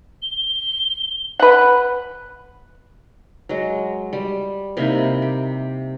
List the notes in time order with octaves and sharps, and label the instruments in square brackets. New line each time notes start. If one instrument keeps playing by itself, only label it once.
[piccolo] G7
[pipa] B4 F#5
[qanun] F#3 G#3
G3
C3 A#3 D#4 E4
G4